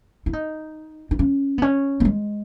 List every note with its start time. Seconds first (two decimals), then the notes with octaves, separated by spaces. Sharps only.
0.26 E4
0.33 D#4
1.11 D#4
1.19 C#4
1.58 B3
1.62 C#4
2.00 A#3
2.05 G#3